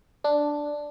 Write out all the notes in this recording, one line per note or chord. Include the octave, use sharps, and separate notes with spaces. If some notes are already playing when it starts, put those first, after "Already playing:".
D4